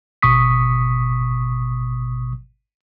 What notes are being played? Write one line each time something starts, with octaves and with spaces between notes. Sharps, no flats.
G#1 B2 C#6 D#6 B6